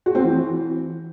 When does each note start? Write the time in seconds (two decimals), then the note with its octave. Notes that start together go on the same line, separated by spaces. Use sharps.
0.06 F#4
0.15 C4
0.24 E3